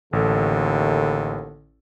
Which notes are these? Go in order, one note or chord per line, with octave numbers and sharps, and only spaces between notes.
A1 D#2 D3 A4